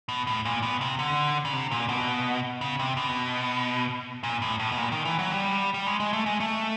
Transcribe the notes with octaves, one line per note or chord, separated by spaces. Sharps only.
B2
A2
A#2
B2
C3
D3
C#3
C3
A#2
B2
C#3
C3
B2
A#2
A2
A2
B2
A#2
D#3
E3
F#3
G3
G3
G#3
G#3
A3
G#3
A3